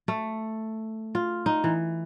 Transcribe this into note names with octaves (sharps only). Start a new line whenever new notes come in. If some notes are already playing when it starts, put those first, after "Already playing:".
A3
F4
D#4
E3